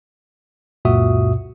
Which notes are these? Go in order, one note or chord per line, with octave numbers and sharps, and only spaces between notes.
C#2 F#2 A#2 F#4 E5 D#6